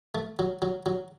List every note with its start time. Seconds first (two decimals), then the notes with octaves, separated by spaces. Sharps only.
0.15 A3
0.39 F#3
0.62 F#3
0.86 F#3